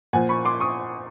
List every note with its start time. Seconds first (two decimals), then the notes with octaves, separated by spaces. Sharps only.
0.13 A#2 F3 F#5 G#5
0.29 B5 C#6
0.45 C6 D6
0.60 C#6 D#6